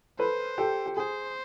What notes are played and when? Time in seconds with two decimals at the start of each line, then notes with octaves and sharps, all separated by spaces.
0.19 A4 B4 C5
0.58 G4 A4
0.86 G4
0.96 G#4 C5